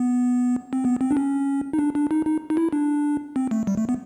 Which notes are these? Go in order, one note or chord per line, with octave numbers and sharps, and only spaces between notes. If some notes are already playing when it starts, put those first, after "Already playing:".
Already playing: B3
C4
B3
C4
D4
C#4
D#4
D4
D4
D#4
D#4
D#4
E4
D4
C4
A3
G3
A3
B3